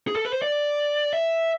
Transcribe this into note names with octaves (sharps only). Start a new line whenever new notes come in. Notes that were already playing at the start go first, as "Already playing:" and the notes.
G#4
A4
B4
C5
D5
E5